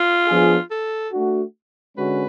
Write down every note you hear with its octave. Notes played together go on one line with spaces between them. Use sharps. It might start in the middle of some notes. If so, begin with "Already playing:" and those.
Already playing: F4
F3 B3 D4 G#4
A4
A3 D4 F#4
D3 G#3 C#4 F#4 B4